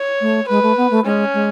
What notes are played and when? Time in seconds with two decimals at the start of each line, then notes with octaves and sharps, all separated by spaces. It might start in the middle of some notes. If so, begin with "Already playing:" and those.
Already playing: C#5
0.21 A3
0.48 G#3 B4
0.63 A3
0.77 B3
0.90 A3
1.05 G#3 C#4
1.34 G#3